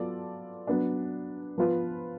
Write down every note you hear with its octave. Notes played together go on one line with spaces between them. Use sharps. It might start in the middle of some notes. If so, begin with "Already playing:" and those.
Already playing: F#3 B3 F4 A4 D5
F#3 B3 D4
F3 B3 F4 B4